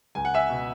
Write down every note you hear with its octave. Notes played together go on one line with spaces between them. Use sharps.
C#2 G#5
F#5
E5 G#5
B2